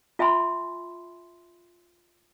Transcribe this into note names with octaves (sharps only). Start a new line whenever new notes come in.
F4 E5 G#5 B5 C6